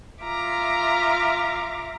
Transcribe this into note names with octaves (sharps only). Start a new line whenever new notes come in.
F4 E5 F5 A#5 D6